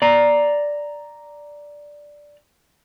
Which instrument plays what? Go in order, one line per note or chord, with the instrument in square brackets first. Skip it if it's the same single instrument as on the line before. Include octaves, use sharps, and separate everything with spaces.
[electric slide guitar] D5 A#5